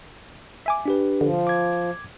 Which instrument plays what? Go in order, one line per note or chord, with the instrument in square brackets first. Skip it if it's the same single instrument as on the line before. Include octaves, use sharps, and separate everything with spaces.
[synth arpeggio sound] E5 G#5 D6
[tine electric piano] D4 G4 B4
[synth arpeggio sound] D3 [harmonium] F3
[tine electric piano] D6 G#6